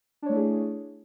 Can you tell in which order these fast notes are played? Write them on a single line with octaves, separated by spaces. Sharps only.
D4 C#5 A3 E4 G#4